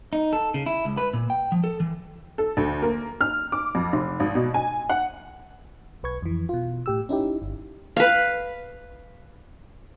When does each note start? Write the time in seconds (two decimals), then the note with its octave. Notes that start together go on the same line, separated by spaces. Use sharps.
0.13 D#4
0.33 A4
0.54 C#3
0.66 E4
0.85 C#2
0.97 B4
1.13 A#2
1.30 G5
1.52 F3
1.64 A4
1.80 E3
2.38 A4
2.57 D2
2.82 A#3
3.21 F6
3.52 D6
3.75 F2
3.93 F1
4.20 G#1
4.35 B2
4.54 G#5
4.90 F#5
6.03 B1 B4 C#6 G#6
6.23 F2 E3
6.49 B2 F4
6.86 A2 G4 E6
7.09 C#4 D#4 E4 G4
7.42 G1
7.96 B4 F5